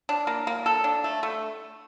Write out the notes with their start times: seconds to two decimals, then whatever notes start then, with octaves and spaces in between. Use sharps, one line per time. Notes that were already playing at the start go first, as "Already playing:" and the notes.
0.09 D4
0.27 A#3
0.47 A#3
0.66 A4
0.84 D4
1.04 A3
1.23 A3